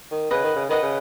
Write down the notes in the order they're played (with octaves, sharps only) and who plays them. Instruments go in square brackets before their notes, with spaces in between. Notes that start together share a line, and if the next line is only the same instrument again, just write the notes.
[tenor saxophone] D#3
[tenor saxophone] C#3 [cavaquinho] B4 D#5 F#5
[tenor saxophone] D#3
C#3
[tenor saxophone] D#3 [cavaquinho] B4 D#5 F#5
[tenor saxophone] C#3